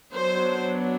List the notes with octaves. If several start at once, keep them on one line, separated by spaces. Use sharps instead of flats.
F#3 B3 D4 C5